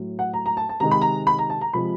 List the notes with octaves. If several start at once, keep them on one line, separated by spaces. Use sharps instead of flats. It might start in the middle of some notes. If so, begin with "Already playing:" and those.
Already playing: A2 F#3
F#5
A#5
A#5
A5
A5
C3 D#3 G#3 A#5
B5
A#5
B5
A#5
A5
A#5
C3 F3 G#3 B5